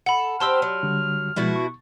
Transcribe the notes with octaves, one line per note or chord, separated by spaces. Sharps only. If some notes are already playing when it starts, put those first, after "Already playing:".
A4 F#5 B5
C4 G4 C5 A5 C6 E6 F6
F#3
D3 G3
B2 F3 G#3 E4 F#4
C#6